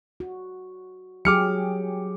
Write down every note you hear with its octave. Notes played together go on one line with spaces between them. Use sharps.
F#4
F#3 G4 G#4 D6 F6 C#7